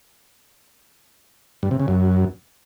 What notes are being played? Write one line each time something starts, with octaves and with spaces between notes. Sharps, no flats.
G2
C3
C#3
F#2